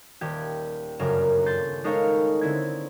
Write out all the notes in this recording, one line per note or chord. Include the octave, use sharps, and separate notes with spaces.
D#1 G4 G#6
G1 F#2 C#3 A#4
C6 G6 A6
G#3 D#4 A4 A#4 C#5 F5
D3 C4 E4 G#6